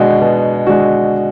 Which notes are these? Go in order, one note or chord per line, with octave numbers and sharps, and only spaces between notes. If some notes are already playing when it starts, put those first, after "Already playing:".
Already playing: B2 G#3 D4 F#4
B2
G#3 D4 F#4